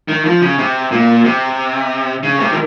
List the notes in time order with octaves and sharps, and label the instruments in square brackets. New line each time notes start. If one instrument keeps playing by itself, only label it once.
[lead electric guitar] D#3
F3
C#3
C3
A#2
C3
C#3
C3
D#3